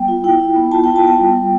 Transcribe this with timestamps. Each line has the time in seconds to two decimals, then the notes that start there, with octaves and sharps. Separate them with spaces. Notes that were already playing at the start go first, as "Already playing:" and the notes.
Already playing: G3 B3 G5
0.08 F4
0.24 E4 G5
0.40 E4
0.56 B3
0.72 F4 A5
0.84 F4 G5
0.96 A5
1.03 B3 G5
1.20 G3
1.35 G3